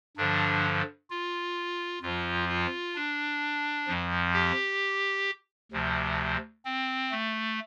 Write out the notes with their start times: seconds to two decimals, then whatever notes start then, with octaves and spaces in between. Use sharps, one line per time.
0.17 G2 D3 F3 D4
1.10 F4
2.02 F2 F3 F4
2.49 F4
2.95 D4
3.88 F2 F3
4.34 G4
5.72 D2 C3 F3
6.65 C4
7.11 A3